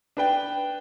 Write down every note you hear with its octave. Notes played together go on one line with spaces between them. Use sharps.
D4 B4 G5